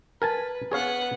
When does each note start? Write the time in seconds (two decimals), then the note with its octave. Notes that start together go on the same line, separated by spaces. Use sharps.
0.22 A#4 B4 G#5 A5
0.72 B3 G#4 C#5 F5 F#5